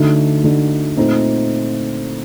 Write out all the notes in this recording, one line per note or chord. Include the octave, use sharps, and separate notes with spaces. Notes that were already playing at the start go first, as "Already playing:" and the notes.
Already playing: D2 D3 A3 D#4
D2 D3 A3 D#4
A#2 A3 C4 D#4